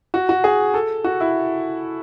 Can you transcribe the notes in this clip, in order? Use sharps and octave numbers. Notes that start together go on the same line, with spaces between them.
F#4
F#4
G#4
A4
F#4
E4